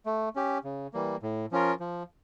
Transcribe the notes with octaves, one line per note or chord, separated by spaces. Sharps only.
A3
C#4 G4
C#3
E3 G3 A#3
A2
F3 C#4 F4 A#4
F3